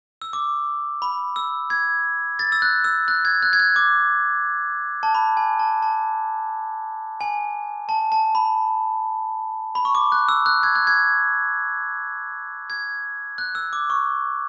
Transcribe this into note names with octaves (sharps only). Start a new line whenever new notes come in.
E6
D6
B5
E6
G#6
A6
E6
F#6
E6
F#6
G#6
F#6
G#6
F#6
D6
A5
B5
G#5
A5
A5
G#5
A5
A5
B5
B5
C#6
D6
F#6
E6
F#6
G#6
F#6
G#6
G#6
F#6
E6
D6
C#6